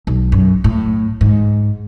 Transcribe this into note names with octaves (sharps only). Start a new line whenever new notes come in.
B1
F#2
A2
G#2